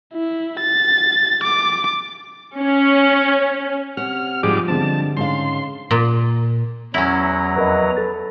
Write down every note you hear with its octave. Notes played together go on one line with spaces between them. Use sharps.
E4
A6
D6
C#4
C3 F#5 F6
G#2 F3 G3 F4 G#4 D6
G2 D3 G#3 C4 A5
G#2 C#3 F5 C6
A#2
E2 F#3 C#4 E4 A#5
F2 A#4 B4 D#5
A4 A6